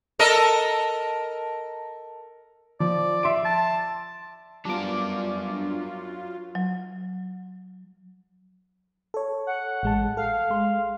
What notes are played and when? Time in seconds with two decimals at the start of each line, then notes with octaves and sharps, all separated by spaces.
0.19 A4 A#4 D#5
2.80 F3 D5
3.23 E5 C6 D7
3.45 A5
4.65 F#3 G3 B3 D4 F4 A#4 D6
6.55 F#3
9.14 A4 C#5
9.47 F#5
9.83 A1 G#3 A5
10.17 A4 F5
10.50 G#3 C6